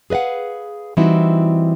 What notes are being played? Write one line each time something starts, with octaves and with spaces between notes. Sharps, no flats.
G#4 B4 D#5 F5 F#5
E3 G3 C4 D#4 E4 F#4